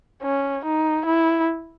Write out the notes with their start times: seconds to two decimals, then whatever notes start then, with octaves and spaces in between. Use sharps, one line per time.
0.23 C#4
0.65 D#4
1.06 E4